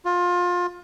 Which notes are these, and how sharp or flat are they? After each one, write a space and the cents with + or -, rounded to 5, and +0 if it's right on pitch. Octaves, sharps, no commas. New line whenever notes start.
F4 +25